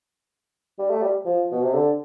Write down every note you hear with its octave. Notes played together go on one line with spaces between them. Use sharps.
G3
A3
G3
F3
B2
C3
D3